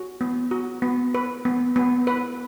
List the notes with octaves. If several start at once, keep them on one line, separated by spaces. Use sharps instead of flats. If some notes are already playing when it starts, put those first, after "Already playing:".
Already playing: F#4
B3
F#4
B3
B4
B3
B3
B4